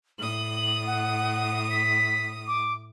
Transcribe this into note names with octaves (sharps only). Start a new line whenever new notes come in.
A2 D#6 F#7
F#5
B6
D6